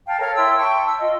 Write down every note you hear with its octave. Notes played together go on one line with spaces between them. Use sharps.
F5 G5 A5
A4 A#4 C#5 F5
E4 G5 C6 E6
G5 A5 C#6
E6
F4 D#5